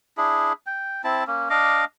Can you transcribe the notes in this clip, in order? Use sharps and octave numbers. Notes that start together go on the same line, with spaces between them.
D4 E4 G#4
G5
C4 E4 A5
A#3 C#4
D4 D#5 F5 D6